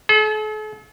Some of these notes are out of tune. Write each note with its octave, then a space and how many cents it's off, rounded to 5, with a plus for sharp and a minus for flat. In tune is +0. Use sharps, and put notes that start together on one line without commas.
A4 -45